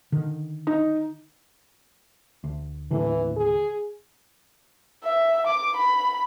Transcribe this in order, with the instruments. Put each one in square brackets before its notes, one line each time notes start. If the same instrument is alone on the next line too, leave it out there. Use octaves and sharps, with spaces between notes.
[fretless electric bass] D3 D#3
[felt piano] D#4
[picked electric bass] D2
[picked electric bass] D#2 A2 D3 [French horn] E3
[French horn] G#4
[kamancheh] E5
D6
B5